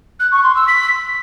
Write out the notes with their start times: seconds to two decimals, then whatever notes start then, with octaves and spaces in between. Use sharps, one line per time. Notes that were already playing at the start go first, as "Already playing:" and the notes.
0.20 F#6
0.31 C#6
0.43 C6
0.55 E6
0.67 B6